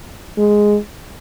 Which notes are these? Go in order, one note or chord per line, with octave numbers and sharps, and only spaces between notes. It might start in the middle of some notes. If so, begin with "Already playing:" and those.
G#3